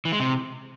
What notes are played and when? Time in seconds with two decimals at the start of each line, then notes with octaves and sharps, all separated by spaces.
0.05 E3
0.12 G#3
0.20 C3